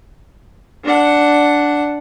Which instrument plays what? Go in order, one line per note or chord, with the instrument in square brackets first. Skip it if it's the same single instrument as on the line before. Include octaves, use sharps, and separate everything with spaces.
[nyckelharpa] D4 F#5